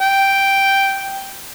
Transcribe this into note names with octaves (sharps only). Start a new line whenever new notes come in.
G5